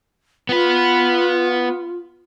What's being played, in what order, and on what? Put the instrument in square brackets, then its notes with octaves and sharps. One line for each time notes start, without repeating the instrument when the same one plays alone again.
[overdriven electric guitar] B3 B4 [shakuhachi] F4